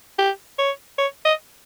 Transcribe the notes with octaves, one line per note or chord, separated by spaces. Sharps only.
G4
C#5
C#5
D#5